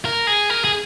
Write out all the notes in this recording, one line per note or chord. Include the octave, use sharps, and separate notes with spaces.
A#4
G#4
A#4
G#4